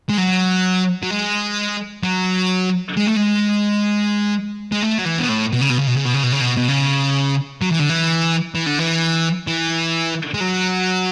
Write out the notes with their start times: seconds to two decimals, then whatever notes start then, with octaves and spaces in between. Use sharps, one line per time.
0.09 G#3
0.18 F#3
1.03 F#3
1.11 G#3
2.04 F#3
2.97 G#3
3.07 A3
3.16 G#3
4.72 G#3
4.83 A3
4.99 F#3
5.06 E3
5.19 B2
5.29 A2
5.53 B2
5.61 C#3
5.70 B2
5.79 C#3
5.87 B2
5.97 C#3
6.05 B2
6.14 C#3
6.23 B2
6.32 C#3
6.41 B2
6.57 B2
6.68 C#3
7.62 F#3
7.71 E3
7.80 D3
7.89 E3
8.55 E3
8.66 D3
8.79 E3
9.47 E3
10.34 G#3
10.40 F#3